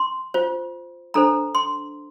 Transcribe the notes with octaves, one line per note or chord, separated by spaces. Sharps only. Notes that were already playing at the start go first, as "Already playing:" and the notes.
Already playing: C6
F4 C5
D4 A4 C5 A#5
C6